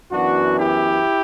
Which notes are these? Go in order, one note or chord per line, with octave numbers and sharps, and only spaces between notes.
F#2 E3 B3 D4 F#4
E4 G4